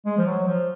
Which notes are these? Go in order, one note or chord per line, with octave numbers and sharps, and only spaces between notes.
G#3
F3
F#3
F3